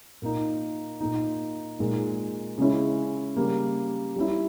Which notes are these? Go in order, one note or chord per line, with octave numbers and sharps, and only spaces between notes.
A#2 A#3 D#4
A#2 A#3 D#4
A#2 G#3 D#4
C#3 G#3 C#4 E4
C#3 G3 A#3
G3 C#4 E4